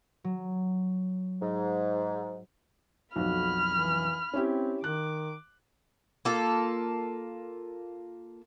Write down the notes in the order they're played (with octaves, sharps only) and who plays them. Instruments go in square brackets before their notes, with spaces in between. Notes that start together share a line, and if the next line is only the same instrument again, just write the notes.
[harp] F#3
[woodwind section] G#2
[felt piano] B1 F2 [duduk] F#4 [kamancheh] B5 F6
[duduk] E3
[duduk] C4 [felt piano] C#4 E4 G4
[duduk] D#3 [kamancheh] D6 [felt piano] F#6
[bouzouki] A#3 F4 A4